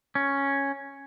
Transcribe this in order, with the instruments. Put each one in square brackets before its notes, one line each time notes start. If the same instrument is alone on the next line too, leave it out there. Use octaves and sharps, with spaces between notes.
[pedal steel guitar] C#4